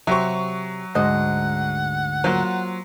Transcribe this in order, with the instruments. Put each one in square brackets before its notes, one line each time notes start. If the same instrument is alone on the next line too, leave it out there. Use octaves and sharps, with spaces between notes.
[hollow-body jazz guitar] C3 G4 C5 [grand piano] F#3 C#6 [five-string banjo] E5
[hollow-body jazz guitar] D2 G#2 G#3 [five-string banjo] C5 D#5 [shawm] F#5
[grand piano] F#3 [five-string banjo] A#3 F4 C5